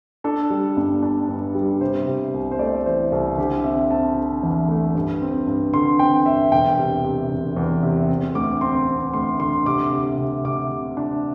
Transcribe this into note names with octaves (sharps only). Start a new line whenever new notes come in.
D4 A4
G3
G1
D4
G2
G3
C3 C5
C3
C2
C5
A3 D5
E3 C5
C2 A4
D3 G4
C4 E5
C4 A5
D3
E2
A3
G2
C4
G2
D3 C6
C4 G5
G2 E5
E1 G5
C3
C3
E1
E2
C3
C4
D2 D6
C4 C6
C4
D2 C6
D3 C6
C3 D6
C3
C3
C3 D6
C3
D4